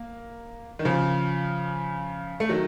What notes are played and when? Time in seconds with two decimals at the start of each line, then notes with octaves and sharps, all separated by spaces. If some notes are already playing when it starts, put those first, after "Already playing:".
Already playing: A#3
0.79 D#3
0.85 C#3 F3
2.40 A3
2.49 D#3 F#3